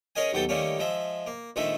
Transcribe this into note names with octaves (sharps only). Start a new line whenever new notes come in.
C#4 G#4 A#4 D#5 G#5
D#2 F#3 B3 A4 G5 A5
D#3 G3 A3 A#3 C#4
F3 G#3 E5
A#3
A#1 D#3 G#3 A3 E5